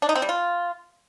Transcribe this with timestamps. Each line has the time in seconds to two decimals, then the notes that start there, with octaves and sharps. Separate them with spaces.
0.02 D4
0.09 D#4
0.16 C4
0.22 G3
0.29 F4